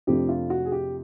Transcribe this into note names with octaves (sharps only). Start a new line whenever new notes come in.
F2 C3 F3 A3 D4 G4
F4
F#4
G#4
G4